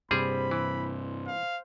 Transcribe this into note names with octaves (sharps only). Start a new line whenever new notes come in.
G2 C3 G3 G#4 C5 B5
E3
F5